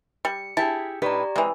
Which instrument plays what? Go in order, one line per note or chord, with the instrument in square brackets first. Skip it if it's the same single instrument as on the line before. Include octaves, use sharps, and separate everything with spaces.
[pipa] G3 [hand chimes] C#7
[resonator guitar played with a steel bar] E4 G4 G#4 [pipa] A5
[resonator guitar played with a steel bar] A2 D#4 B4 [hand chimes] G4 D5 A#5
[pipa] C3 E3 [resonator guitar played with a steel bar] G#3